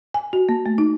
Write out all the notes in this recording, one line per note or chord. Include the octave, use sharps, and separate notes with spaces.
G#5
F#4
A#3
A3
D#4